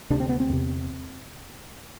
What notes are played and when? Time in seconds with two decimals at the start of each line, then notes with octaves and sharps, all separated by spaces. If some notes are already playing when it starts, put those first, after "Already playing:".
0.10 D2 C3 D4
0.20 C4
0.29 B3
0.40 C4
0.50 E2 C3